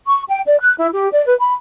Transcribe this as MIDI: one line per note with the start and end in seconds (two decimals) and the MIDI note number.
0.07 0.24 85
0.29 0.40 79
0.46 0.59 74
0.60 0.73 90
0.78 0.88 64
0.92 1.08 67
1.12 1.24 74
1.25 1.34 71
1.39 1.52 83